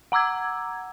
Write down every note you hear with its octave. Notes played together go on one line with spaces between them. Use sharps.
F#5 A#5 D6 E6 G#6